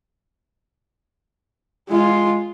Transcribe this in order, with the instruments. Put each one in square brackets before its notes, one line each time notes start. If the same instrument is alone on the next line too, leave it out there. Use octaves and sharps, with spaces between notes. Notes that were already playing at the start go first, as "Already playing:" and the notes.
[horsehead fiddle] G#3 F4